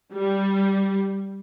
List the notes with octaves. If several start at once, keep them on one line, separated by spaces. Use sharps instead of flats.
G3